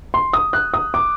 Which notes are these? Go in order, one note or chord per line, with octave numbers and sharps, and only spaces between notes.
C6
D#6
F#6
D#6
D6